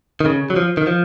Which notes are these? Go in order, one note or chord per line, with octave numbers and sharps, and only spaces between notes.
D#3
C#3
F#3
F3
D#3
F3